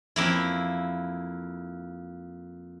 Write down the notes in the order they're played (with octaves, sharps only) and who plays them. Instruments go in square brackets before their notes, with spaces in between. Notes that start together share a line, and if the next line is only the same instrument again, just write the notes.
[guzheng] F2 A#3 E4